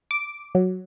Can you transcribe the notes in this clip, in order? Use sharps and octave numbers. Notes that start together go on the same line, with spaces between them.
D6
F#3